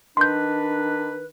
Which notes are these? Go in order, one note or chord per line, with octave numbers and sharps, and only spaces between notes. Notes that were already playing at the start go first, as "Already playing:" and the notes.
D#3 D4 B4 C6 G6